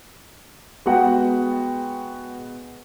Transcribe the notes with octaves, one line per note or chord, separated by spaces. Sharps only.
G#3 B3 F#4 F#5 G5